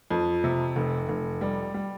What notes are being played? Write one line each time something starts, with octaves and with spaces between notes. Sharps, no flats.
F2
C3
F1
F1
G3
G3